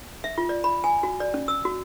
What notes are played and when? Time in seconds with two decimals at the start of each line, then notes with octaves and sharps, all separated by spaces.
0.24 E5
0.38 F4
0.49 D5
0.64 B5
0.84 G#5
1.03 F#4
1.20 D5
1.34 C#4
1.48 E6
1.65 F#4